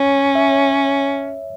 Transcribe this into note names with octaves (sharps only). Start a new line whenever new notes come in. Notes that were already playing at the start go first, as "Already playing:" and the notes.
Already playing: C#4 C#5
E5